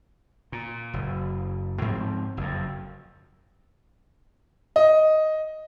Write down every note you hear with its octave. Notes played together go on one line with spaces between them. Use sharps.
A#2
F#1
G#2 F3 C4
F#1 F2
D#5